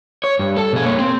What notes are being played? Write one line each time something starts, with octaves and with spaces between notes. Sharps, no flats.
C#5
G2
A4 A5
B2 G#4
A#3 C#5
C4